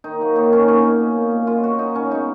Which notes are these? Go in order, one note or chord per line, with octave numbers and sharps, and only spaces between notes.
D#3 D#4
F#3 A#3
D#3 D#4
F#3 A#3 C#4
B2 C#4
A#3
B2
A#3
A#2
F#3 B3 F4
A#2 F#4
F#3 B3 D#4
B2 C#4
G#3 B3 D#4